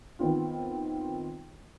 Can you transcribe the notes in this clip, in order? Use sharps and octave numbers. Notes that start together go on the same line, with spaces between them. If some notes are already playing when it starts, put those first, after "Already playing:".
D#3 B3 C4 F4